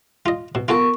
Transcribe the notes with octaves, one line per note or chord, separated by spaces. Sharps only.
F4 D#5
B2
B3 F4 F#4 A4 A#4 C#6